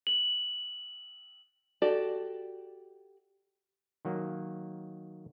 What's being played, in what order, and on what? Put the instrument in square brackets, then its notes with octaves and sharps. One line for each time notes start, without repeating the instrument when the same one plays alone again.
[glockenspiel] F#7
[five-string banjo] F#4 G4 A4 D5
[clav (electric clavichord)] D#3 F#3 A#3